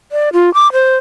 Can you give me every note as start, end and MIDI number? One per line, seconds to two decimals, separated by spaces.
0.12 0.29 74
0.33 0.53 65
0.54 0.71 86
0.73 0.97 72